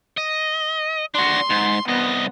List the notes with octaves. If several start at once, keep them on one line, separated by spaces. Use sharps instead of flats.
D#5
D4 F#4 C6
G#2
C2 B3 D#5